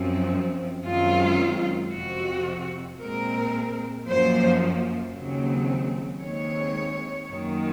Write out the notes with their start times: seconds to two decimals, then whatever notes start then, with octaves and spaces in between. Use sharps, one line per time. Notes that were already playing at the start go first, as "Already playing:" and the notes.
Already playing: F#2 F3 C4
0.86 F#2 D#3 G#3 C4 F4
1.93 F2 C3 F3 C4 F#4
3.00 A#2 G#3 C4 A#4
4.07 F#2 F3 A#3 C5
5.14 D#2 C#3 F#3 C4
6.21 D#2 D#3 G#3 C4 C#5
7.28 F#2 D#3 A#3